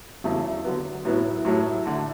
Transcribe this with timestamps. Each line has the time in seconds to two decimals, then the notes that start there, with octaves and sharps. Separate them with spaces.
0.24 E2 C#3 F#3 A3 E4
0.64 D3 F#3 B3
1.05 A2 F#3 B3 E4
1.45 A2 F#3 A3 E4
1.85 D3 A3